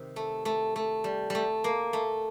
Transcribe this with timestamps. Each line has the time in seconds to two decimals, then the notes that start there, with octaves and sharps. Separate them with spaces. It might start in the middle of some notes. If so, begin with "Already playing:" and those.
Already playing: C3 D#3
0.16 A3
0.45 A3
0.76 A3
1.04 G3
1.30 G3 A3
1.64 A#3
1.93 A3